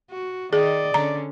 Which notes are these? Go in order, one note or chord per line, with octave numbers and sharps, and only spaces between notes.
F#4
D#3 G#4 D5 D#5
D3 C#4 A#5